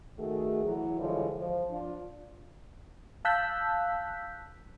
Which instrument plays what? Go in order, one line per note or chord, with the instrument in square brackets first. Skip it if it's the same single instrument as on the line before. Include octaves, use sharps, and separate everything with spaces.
[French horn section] D#3 A3 F#4 G#4
E3 F#3
D3 E3 F3 G3 G#3 C#5
F3
D4 F4
[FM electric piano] F5 A5 E6 F#6 G6 B6